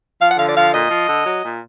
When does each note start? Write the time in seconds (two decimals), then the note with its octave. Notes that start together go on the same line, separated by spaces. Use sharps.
0.20 F3 F5
0.30 F#5
0.38 D3 F5
0.47 D5
0.56 F3 F5
0.73 A#2 D#5
0.90 F3
1.08 D3
1.25 F#3
1.44 A#2